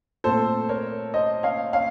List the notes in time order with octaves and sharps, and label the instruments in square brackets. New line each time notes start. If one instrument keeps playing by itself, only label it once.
[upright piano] A#2 A3 C4 A4 C5
A#4 C#5
C5 D#5
C#5 F5
C#5 F5